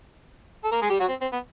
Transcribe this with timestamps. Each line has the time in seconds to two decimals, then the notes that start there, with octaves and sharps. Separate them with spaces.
0.64 A4
0.72 A#3 A#4
0.82 G#3 G#4
0.90 G3 G4
1.00 F#3 F#4
1.09 C4
1.21 C4
1.33 B3